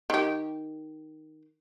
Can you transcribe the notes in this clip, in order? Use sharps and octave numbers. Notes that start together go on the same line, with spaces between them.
D#3 G4